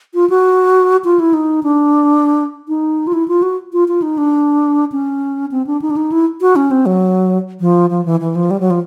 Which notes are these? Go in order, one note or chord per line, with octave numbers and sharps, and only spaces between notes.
F4
F#4
F4
E4
D#4
D4
D#4
F4
E4
F4
F#4
F4
F4
D#4
D4
C#4
C4
D4
D#4
D4
D#4
E4
F#4
C#4
C4
F#3
F3
F3
E3
E3
F3
G3
F#3
F3